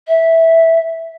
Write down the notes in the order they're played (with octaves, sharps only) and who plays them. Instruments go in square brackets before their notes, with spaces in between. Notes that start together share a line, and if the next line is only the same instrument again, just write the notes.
[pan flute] E5